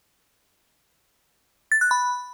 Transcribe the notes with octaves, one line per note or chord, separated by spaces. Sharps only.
A6
F#6
B5